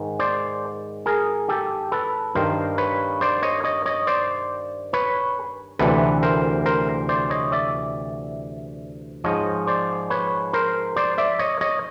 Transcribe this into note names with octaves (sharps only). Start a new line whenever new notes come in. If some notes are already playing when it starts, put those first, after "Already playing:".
Already playing: G#2 D#3
C5 D5
G#4 A#4
G4 A4
A4 B4
G2 D#3 A#4 C5
B4 C#5
C5 D5
C#5 D#5
C#5 D#5
C#5 D#5
C5 D5
B4 C#5
D2 C3 E3 A4 B4
A#4 C5
A#4 C5
C5 D5
C#5 D#5
D5 E5
G#2 F3 C#5 D#5
C5 D5
B4 C#5
A#4 C5
C5 D5
D5 E5
C#5 D#5
C#5 D#5